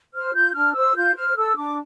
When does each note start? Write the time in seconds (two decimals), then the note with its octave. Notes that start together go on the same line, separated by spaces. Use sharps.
0.13 C5 F6
0.33 F4 G6
0.54 D4 F6
0.74 C5 E6
0.95 F4 G6
1.15 C5 F6
1.36 A4 E6
1.56 D4 D6